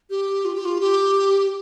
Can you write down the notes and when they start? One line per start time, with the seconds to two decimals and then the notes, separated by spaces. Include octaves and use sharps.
0.10 G4
0.45 F4
0.55 G4
0.65 F4
0.81 G4